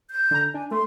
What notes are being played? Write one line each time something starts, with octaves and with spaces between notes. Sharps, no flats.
G6
D3 A#5
D4 G#5
A3 C6